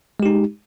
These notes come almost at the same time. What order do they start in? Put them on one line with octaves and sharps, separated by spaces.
G#3 G4 D#4